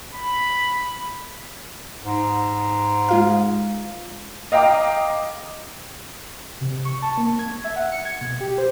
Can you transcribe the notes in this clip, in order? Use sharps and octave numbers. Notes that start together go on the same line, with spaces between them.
B5
G#2
G#3 F4 F5
D#5 F5 G5 A#5 D6 D#6
C3
C#6
A5
A#3
G#6
E5
F#5
C#7
G#6
B2
G4
C5